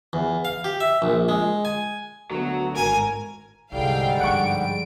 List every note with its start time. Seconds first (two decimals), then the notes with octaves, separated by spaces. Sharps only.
0.13 E2
0.45 F5
0.64 G4
0.80 E5
1.02 A#1
1.29 G#3
1.65 G#5
2.31 D2 F#3 B3
2.76 G#1 A#4 G#5
3.72 C2 G#2 D3 G3 F5 G5
4.20 G2 F3 F#5 C#6 D7